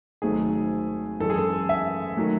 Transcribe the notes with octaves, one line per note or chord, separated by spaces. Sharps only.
G#1 G#2 F#3 A3 G#4
F#2 E3 G#3 A4
G#4
A4
E5
D#3 F#3 A3